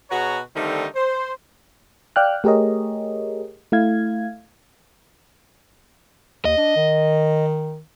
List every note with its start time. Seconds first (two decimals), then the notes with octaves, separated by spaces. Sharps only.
0.10 B2 F#4 G#4 B4 C#5 A#5
0.56 D3 D#3 G3 A3 C4 D#4
0.95 C5
2.16 D5 F5 G5 F6 F#6
2.44 A3 G4 G#4 A#4 C#5 D#5
3.72 A3 E4 F5 G#6
6.45 D#2 D#5
6.58 D4
6.76 D#3